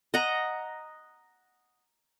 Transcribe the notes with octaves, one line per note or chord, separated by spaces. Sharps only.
D#5 F#5 A#5